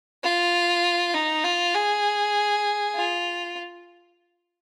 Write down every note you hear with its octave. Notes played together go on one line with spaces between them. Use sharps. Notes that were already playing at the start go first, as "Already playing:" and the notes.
F4
D#4
F4
G#4
F4